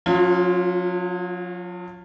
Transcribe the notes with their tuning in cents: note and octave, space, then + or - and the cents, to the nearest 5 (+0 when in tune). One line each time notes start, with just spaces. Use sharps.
F#3 -45 C#4 +0 F4 +0